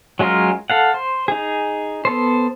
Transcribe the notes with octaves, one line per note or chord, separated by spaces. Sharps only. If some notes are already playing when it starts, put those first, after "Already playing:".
F#3 G#3 C#4 F4 A#4
A4 F5 F#5
C5
D#4 G#4
B3 A4 C5